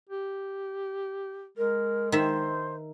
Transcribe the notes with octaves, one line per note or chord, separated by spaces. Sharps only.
G4
G#3 A#4
D#3 C5 E5